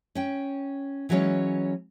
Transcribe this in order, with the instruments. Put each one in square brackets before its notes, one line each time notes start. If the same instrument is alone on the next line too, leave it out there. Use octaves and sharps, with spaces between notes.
[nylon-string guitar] C#4 G5
E3 F#3 G#3 C#4 C#5